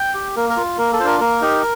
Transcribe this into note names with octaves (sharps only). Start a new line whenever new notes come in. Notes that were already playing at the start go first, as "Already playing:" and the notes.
Already playing: G5
G4
A#3 A#4
A#4
F4
A#3 A#4
A4
D4 F4 A#4 C5
A#3 A#4
D#4 G4